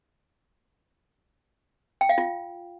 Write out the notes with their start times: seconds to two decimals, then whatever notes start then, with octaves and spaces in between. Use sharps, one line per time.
2.01 G5
2.09 F5
2.18 F4